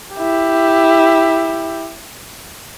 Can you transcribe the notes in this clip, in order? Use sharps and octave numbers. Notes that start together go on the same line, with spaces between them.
E4 G4